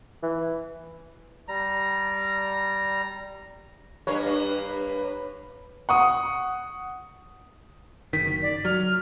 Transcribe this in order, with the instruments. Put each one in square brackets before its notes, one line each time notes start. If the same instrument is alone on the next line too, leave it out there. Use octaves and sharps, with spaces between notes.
[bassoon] E3
[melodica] G3 A#5
[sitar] G2 A#3 C#5 [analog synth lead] B4
[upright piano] F#5 C#6 D#6
[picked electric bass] F#1 D#3 [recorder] B6
[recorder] D5
[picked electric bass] F#3 [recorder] F6